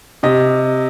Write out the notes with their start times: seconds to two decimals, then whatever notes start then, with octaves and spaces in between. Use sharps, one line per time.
0.23 C3 D#5